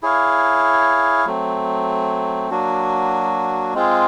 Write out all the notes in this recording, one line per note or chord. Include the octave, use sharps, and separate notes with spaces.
E4 G#4 C#5 F5
F#3 A3 C4
F#3 A#3 D4 F#4
G#3 C4 F4 G#4